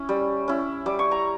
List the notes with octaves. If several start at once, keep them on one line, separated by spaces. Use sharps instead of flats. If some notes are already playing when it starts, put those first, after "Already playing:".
Already playing: C#4 E4
G3
C#4 E4
G3 D6
C#6
A#5